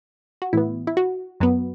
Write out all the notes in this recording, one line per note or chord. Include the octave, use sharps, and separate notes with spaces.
F#4
A2 E3 B3 E4
E4
F#4
F#2 F#3 B3